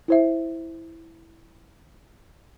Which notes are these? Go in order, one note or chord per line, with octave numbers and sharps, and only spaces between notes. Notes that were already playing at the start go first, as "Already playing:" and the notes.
E4 C5 E5